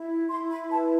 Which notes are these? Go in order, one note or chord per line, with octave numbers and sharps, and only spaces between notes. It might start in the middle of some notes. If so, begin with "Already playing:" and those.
Already playing: E4
E4 C6
B5
B4 A5